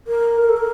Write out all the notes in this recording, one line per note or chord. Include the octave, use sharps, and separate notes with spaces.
A#4
A#4
A4
A#4